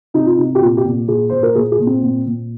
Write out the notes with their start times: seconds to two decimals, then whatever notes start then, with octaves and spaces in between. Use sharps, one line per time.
0.14 C3 D#4
0.26 F4
0.38 C3 D#4
0.55 G4
0.61 A#2 F4
0.77 G4
0.85 A#2
1.08 A#2 G#4
1.29 A#2 C5
1.43 A#4
1.55 A#2 G#4
1.72 G#4
1.79 A#2
1.87 C4
2.03 A#2
2.26 A#2